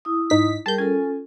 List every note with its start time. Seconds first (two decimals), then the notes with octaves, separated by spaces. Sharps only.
0.05 E4 D#6
0.30 G#2 D#4 B6
0.66 G3 G#4 A#4 A5 G6
0.78 C#4 F4 A4 G#5